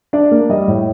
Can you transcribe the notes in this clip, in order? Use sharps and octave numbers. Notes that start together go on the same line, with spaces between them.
D4 D5
A#3
G3 D#5
A2